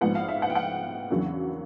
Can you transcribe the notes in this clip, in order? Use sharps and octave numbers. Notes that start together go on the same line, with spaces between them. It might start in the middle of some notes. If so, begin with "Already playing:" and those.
A#1 G#2 F3 G#3 B3 F#5
F5
E5
F#5
G5
F#5
E2 C#3 F#3 A#3 D4